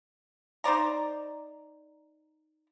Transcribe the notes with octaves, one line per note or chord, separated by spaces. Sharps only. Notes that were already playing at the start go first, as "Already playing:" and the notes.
D#4 C5 D5 A#5